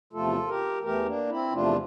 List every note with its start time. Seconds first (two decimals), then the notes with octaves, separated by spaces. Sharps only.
0.13 E2 C3 F3 A3 F4 A4
0.47 G4 A#4
0.83 E2 E3 A3 G4 A#4
1.05 A#3 D4
1.29 C4 E4
1.52 E2 C3 F3 A3 D4 F4